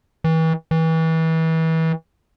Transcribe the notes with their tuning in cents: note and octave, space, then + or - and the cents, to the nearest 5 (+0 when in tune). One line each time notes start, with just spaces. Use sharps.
E3 -35
E3 -30